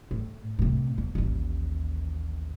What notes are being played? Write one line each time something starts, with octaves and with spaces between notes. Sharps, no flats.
A2
A2 C3
E2
A1 D#2